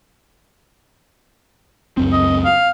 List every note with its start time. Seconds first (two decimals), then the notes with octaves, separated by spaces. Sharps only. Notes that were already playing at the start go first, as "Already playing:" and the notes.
1.97 C#2 F#2 C4
2.12 D#5
2.45 F5